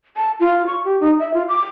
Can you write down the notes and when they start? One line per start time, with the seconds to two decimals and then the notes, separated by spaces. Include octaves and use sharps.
0.17 A5
0.40 F4
0.67 C#6
0.85 G4
1.00 D#4
1.19 E5
1.34 F4
1.48 D6